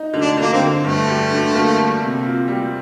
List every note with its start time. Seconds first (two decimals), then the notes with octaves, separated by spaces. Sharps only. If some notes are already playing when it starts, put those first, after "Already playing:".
Already playing: D#4
0.13 D3
0.21 D4
0.37 D3 A#3
0.53 C4
0.60 D3
0.84 G2 A3
1.07 G3
1.30 D3
1.54 A#3
1.77 G3
2.02 C3
2.25 F4
2.48 G3